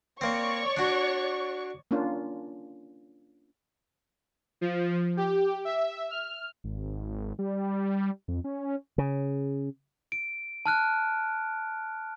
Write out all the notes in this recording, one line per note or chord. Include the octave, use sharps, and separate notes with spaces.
A#3 C4 C#5 D5 C#6
D4 F#4
A#3 C#4 D4 F4
F3
G4
E5
F6
G#1
G3
F2
C#4
C#3
D7
A5 F6 F#6